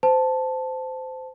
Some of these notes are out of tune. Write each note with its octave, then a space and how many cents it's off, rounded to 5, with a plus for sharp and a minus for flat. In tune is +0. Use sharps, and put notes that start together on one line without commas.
C5 -20 A5 +0